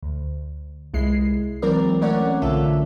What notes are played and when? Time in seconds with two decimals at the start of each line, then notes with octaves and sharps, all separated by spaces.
0.03 D2
0.94 C2 G#3 E4 C7
1.62 E3 F#3 C4 A#4 D5
2.01 A3 C#4 A#4 C#5 D5 F#5
2.42 B1 D3 F4 A4 E5